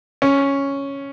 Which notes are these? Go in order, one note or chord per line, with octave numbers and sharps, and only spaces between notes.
C#4